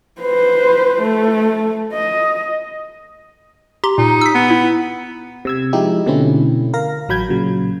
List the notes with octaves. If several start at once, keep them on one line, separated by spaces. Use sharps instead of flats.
B4 C5
A3
D#5
G4 A#5 C6
A#2 D#4
E6 B6
B3
E4
C3 E6 G#6
F3 G#3 D#4 E4 G4
B2 D3 A3 C4 C#4 E4
A#4 F5 A#6
A1 F#3 B5 G6 G#6
A#2 C#3 F#3